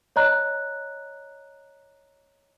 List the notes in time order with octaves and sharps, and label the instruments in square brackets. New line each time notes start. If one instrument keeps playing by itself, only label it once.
[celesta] C#5 D#5 A#5 F#6